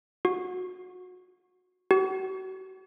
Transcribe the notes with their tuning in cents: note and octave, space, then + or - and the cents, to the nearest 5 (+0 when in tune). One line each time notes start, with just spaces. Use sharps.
F#4 -25
F#4 +35